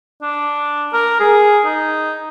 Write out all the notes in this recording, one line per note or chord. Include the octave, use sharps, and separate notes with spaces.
D4
A#4
G#4
D#4